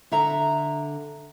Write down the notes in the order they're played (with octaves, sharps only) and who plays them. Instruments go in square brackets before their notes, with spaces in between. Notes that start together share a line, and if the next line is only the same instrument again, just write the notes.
[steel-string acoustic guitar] D3 E5 A#5